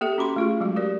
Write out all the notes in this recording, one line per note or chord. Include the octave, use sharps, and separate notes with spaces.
A#3 G4 A4 E5
C#4 F#4 B5 C6
A3 F4 G#4
F#3 G#3 F#4
G4 A#4 D5